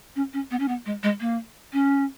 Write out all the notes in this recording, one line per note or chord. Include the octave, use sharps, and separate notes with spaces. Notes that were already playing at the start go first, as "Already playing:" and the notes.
C#4
C#4
B3
C#4
B3
G#3
G#3
A#3
C#4